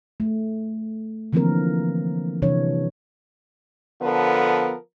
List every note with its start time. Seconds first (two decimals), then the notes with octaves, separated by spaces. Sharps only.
0.20 A3
1.33 D3 E3 F3 A#3 C4 A#4
2.42 C3 E3 G3 D4 C#5
4.02 D3 F3 B3 A4 A#4